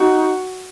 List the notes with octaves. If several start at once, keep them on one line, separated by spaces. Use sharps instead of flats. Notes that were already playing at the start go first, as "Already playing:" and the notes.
Already playing: D#4 F#4